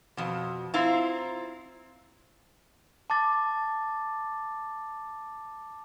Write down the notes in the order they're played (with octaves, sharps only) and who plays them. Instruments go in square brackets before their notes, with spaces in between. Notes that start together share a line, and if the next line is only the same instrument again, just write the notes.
[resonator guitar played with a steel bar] F2 B2
C4 E4 F4 A#5
[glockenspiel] A5 D6 A6